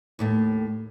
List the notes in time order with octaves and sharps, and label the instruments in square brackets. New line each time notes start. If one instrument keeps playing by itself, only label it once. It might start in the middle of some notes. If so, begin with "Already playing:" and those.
[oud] D#2 A2 A3